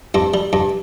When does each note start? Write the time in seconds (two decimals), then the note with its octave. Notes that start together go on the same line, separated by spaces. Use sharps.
0.14 G2 C4
0.34 G3
0.53 G2